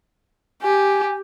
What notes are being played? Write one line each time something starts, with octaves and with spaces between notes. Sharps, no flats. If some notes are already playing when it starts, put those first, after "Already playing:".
G4 G#5